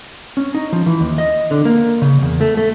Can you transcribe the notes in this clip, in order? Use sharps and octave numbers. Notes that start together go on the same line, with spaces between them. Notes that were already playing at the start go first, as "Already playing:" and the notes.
C#4
D#4
F3
E3
D#2
D#5
D3
A#3
C#3
E2
A3
A3